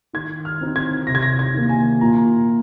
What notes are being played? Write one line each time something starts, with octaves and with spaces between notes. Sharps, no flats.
D#3 G#6
F6
C4 D#4
G#6
C3 A#6
G#6
A#6
G#6
D#3 A#3
G#5
A#2 A#5